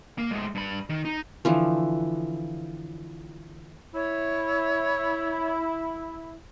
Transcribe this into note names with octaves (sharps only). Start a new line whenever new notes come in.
A#3 A#4
A2 G#3
G2 B5
D#3
D#4
D3 E3 F3
E4 C#5